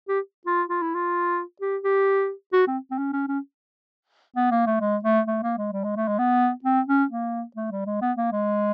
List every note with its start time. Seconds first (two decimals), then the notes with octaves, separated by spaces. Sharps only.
0.09 G4
0.46 F4
0.69 F4
0.82 E4
0.95 F4
1.61 G4
1.83 G4
2.53 F#4
2.67 C4
2.91 C4
2.98 C#4
3.13 C#4
3.28 C#4
4.36 B3
4.51 A#3
4.66 A3
4.81 G#3
5.04 A3
5.27 A3
5.43 A#3
5.58 G#3
5.72 G3
5.84 G#3
5.96 A3
6.07 G#3
6.19 B3
6.64 C4
6.88 C#4
7.11 A#3
7.56 A3
7.71 G3
7.86 G#3
8.01 B3
8.17 A#3
8.32 G#3